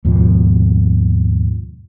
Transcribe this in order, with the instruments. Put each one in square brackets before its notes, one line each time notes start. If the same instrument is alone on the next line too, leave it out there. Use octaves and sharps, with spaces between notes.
[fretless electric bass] D#2 G#2 B2 F3